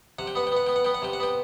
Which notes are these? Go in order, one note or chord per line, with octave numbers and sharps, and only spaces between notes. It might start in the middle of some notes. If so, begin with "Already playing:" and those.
C3 F#5
G5
B3 F#5
G5
B3 F#5
B3 G5
F#5
B3 G5
F#5
C3 G5
F#5
B3 G5